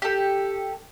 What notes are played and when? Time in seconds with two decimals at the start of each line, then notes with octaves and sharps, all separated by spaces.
0.02 G4 A4